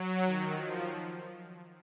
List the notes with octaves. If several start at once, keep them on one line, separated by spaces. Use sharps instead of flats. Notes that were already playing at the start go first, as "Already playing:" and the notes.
Already playing: F#3
D#3
F3